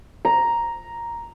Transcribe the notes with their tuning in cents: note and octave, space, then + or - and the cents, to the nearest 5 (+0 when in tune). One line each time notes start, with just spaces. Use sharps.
A#5 +5